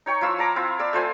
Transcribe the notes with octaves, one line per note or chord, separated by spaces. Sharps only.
D#4 C#5 G5 C#6
F3 E4 F4 E6
A5 A#5 D6
C4 E4 F4
D5 D6 E6
A3 F4 C5 G#5